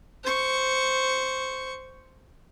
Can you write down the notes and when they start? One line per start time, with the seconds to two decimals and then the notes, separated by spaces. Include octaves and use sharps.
0.24 C5 C#6